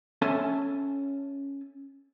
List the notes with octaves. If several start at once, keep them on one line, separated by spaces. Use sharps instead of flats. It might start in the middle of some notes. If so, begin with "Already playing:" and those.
C#4 A4 E5 G#5 A5